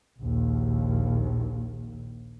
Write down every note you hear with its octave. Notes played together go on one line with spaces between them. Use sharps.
A#1 D#2